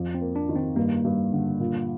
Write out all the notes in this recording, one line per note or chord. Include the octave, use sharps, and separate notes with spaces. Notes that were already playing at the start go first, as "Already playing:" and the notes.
Already playing: F2
C4
A#3
D4
D#3
C4
G2 A#3
G2
D3
A#2